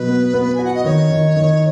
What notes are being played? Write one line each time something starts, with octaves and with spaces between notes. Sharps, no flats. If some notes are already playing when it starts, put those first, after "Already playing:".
Already playing: B2 F#3 B4
B3
B3
F#4 G#5
F#5
D#5
D#3 C#5
D#3
D#3